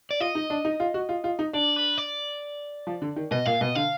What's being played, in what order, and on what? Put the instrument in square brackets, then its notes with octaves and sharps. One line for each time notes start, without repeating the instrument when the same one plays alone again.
[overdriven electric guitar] D5
[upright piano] F4 [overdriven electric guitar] D#5
[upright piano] D#4
D4
D#4
F4
F#4
F4
F4
D#4
[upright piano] D4 [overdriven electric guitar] D5
[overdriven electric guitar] B4
D5
[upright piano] F3
D3
D#3
[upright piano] B2 [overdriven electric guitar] D#5
[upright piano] A#2 [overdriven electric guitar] F5
[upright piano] B2 [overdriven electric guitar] D#5
[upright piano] D3 [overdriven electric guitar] F5